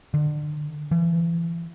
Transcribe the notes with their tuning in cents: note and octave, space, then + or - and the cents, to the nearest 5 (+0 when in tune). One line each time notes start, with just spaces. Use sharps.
D3 +30
E3 +35